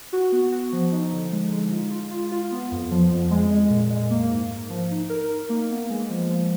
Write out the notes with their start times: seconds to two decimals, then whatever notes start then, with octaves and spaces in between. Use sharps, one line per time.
0.13 F#4
0.32 B3
0.52 F#4
0.73 F3
0.92 D#4
1.13 D3
1.32 G#3
1.52 G#3
1.71 F4
1.91 F4
2.11 F4
2.32 F4
2.51 B3
2.72 F2
2.91 F3
3.11 F2
3.31 G#3
3.51 G#3
3.70 A#2
3.90 G#3
4.10 A#3
4.31 G#2
4.51 A#3
4.70 F3
4.91 D#4
5.10 A#4
5.31 D#4
5.49 A#3
5.70 B3
5.90 G#3
6.10 F3
6.30 F3